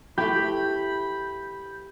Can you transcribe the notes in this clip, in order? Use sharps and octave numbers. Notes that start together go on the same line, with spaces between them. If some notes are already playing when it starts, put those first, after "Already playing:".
E3 A3 G4 B5 G6